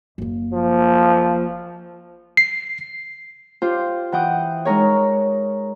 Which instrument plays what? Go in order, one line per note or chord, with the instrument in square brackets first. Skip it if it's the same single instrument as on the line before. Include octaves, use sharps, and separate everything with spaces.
[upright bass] F#1 A#3
[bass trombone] F3
[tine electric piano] C7
[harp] F4 G4 C5
E3 F#5 G5 D#6 F#6
G#3 D#4 A#4 C#5